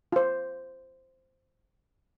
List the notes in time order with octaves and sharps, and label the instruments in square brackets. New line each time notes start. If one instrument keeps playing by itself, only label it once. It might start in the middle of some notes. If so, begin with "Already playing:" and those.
[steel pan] F4 C5